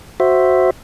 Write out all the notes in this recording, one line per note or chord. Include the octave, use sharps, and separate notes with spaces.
F#4 C5 E5